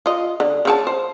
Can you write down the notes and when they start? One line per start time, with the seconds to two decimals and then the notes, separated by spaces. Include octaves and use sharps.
0.06 F4 D#5
0.40 D3
0.65 C#3 C4 A5
0.87 C5